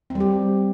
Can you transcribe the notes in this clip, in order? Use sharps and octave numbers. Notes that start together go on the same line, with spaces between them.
C4
G3
G4